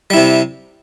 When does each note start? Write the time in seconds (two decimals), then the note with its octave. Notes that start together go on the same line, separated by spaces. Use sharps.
0.10 G3
0.14 E4
0.17 C3